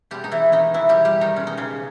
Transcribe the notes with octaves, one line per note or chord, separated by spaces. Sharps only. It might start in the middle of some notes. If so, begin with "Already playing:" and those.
B2 G3 G#3 G4
D#4
E3 E4
D#3 D#4
B2 E3 G#3 E4
G3 G4
G3 G4
D#3 D#4
B2 G#3 C#4
D#4
C#3 C#4